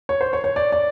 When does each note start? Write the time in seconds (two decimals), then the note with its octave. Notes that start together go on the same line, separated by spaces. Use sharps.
0.09 C#5
0.21 C5
0.33 C#5
0.44 C#5
0.56 D5
0.72 D5